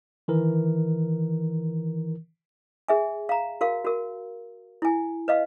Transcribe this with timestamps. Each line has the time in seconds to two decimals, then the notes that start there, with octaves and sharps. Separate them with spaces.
0.28 D#3 E3 A#4
2.88 G#4 E5 G#5
3.29 F5 A#5
3.61 F#4 A#4 F5
3.85 F#4 A#4
4.82 E4 G#5
5.28 B4 D#5 F5